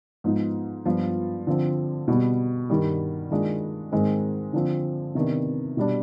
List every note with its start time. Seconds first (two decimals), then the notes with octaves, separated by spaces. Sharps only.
0.24 G#2 F3 B3 D#4
0.85 G2 F3 B3 F4
1.47 D3 F3 C4
2.08 B2 G3 B3
2.69 G2 D#3 G3
3.31 D#3 G#3 D4 F4
3.92 G#2 D#3 G#3 C4
4.53 D3 F3 C4
5.15 C3 D#3 B3 D4
5.77 B2 G3 D4